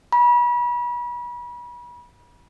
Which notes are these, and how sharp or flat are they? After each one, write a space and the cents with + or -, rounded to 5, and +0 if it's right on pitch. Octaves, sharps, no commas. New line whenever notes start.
B5 -35